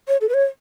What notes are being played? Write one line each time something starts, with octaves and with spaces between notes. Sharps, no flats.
C#5
A4
B4
C#5